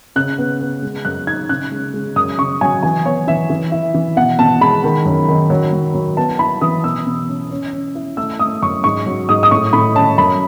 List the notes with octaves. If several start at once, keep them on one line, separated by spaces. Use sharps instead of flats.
C#3 F#6
B3
B3
G#3
F#2 F#6
D#4 G#6
C#3 F#6
G#3
G#3
F#2 D#6
C#3 C#6
F#3 G#5
E3 G#5
B3 C#5
E3 E5
E3
E4
E3
B2 F#5
B2 A5
G#3 B5
D#3
F#2
D#3
F#3
F#3
F#3
B3 A5
A5
E4 B5
E3 D#6
B2 E6
B2
C#4
C#4
C#4
E4
A3 E6
A3 D#6
F#2 C#6
G#2 C#6
F#3
G#2 D#6
D#6
A2 C#6
A2 B5
C#4 A5
F#2 B5